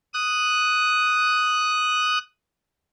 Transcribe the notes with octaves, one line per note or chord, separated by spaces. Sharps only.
D#6 F#6